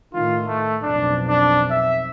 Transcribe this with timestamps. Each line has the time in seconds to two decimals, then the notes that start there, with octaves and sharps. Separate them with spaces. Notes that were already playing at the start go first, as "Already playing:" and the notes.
0.14 A2 D#3 F4
0.47 A3
0.83 B1 F2 D4
1.28 D4
1.70 E5